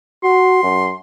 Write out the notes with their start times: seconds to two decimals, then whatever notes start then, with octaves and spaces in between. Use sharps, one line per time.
0.24 F#4 C6
0.63 F#2